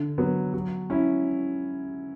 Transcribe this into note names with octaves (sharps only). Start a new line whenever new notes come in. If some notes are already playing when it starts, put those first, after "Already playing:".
Already playing: D3
F#3 B3
F#3
C#4 E4